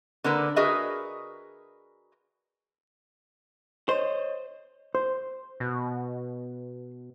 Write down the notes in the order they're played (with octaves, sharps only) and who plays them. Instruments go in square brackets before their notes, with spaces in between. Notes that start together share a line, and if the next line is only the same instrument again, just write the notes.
[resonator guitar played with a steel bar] D3 A#3 A#4 B4
F#4 G#4 A#4 B4 D#5 E5
[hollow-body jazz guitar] C5 [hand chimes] C#5 D#5
[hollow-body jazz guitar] C5
[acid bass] B2